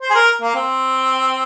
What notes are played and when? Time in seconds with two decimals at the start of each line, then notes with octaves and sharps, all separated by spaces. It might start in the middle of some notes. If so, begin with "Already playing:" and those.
0.01 C5
0.10 G#4
0.15 A#4
0.42 A#3
0.55 C4